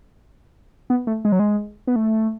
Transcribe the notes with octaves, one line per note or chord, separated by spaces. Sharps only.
B3
A3
G#3
F#3
G#3
B3
A3